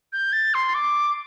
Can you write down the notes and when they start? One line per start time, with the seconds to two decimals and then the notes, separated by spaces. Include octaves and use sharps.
0.13 G6
0.33 A6
0.54 C6
0.74 D6